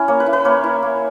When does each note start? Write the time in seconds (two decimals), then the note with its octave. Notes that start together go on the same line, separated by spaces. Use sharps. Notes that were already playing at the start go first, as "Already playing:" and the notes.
Already playing: C#4 E4
0.08 A#3 C#5
0.20 B4
0.26 E4
0.33 B4
0.45 A#3 C#5
0.64 E4
0.82 A#3